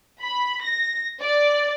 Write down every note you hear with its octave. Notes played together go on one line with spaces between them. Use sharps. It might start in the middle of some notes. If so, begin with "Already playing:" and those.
B5
A#6
D5